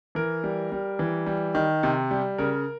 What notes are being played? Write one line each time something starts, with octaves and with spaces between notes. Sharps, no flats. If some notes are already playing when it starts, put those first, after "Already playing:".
E3 A#4
G3
G3
E3
G3
D#3
C3
G3
C#3 A#4